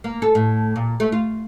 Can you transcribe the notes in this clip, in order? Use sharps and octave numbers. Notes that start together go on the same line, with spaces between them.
A#3
A4
A2
A#2
A3
F4